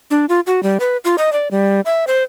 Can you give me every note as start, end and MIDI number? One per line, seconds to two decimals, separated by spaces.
0.11 0.26 62
0.29 0.40 65
0.47 0.63 66
0.63 0.78 55
0.80 0.97 71
1.05 1.16 65
1.18 1.32 75
1.33 1.48 74
1.51 1.81 55
1.85 2.05 76
2.07 2.23 72